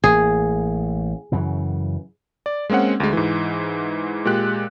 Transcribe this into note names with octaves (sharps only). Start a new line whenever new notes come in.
A1 A#3 G#4
F#2 C#3 E3
D5
G#3 A#3 C4 C#4 F#5
D2 G#3
G#2 E3
A#2 G#3 G4 F#6